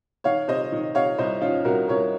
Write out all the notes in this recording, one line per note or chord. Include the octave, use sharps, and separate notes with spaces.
D#3 C#5 F5
C3 C5 D#5
D#3
C3 C#5 F5
C2 C5 D#5
D#3 C#4 F4
C2 F#4 A#4
C2 A#4 C#5